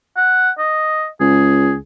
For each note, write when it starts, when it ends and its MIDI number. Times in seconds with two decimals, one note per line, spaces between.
0.17 0.50 78
0.59 1.08 75
1.20 1.76 37
1.20 1.76 68